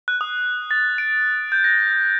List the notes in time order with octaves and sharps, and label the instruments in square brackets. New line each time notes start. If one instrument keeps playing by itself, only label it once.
[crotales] F#6
D#6
A6
D7
G6
A#6